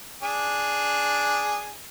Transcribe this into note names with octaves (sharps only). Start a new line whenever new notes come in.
D4 G#4